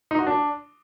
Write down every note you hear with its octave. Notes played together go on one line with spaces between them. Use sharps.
D#4
F#4
D4